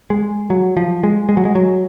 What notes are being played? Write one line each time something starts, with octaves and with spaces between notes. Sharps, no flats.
G#3
F#3
F3
G#3
G#3
F#3
G#3
F#3